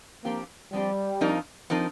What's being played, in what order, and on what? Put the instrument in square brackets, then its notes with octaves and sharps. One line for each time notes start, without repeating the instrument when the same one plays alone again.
[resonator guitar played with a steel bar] F3 C4 G4 [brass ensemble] A#3
[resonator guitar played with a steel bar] F3 C4 G4 [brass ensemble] G3
[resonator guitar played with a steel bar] F2 F3 C4 D#4 A#4
F3 C4 D#4 A#4